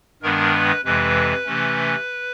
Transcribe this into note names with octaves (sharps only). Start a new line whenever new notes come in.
G2 D#3 G#3 B3 D4 A#4
B4
F2 C3 E3 G#3 B4
C3 E3 A3 C#4